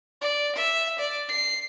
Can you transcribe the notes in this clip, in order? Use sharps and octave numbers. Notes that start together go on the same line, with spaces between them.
D5
E5
D5
C7